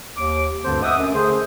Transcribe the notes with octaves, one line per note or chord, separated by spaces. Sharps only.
D#2 D6
D2 G2 D3 C4 A4 C5
D#5 E5 F#5 D6 D#6
F#2
D3 A3 G#4 C5